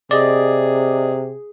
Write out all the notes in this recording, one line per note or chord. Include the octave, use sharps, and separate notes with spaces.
C3 G#4 D5 D#5